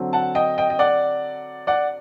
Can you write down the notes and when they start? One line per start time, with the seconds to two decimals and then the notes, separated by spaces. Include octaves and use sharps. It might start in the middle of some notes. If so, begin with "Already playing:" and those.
Already playing: D3 F#3 C4
0.13 F#5 A5
0.35 D#5 G5
0.58 D#5 G5
0.70 D#5
0.79 D5 F#5
1.67 D5 F#5